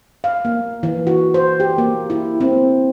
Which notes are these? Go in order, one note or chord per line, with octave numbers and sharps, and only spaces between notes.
F5
A#3
E3
F#4
C5
G4
A#3
E4
C4